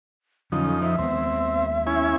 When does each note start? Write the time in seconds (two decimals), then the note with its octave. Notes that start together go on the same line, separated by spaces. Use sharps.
0.52 F2 D3 F#3 C#4 D#4
0.82 F3 E5
0.99 D#2 G#3 B3 C4
1.87 C#4 E4 G#5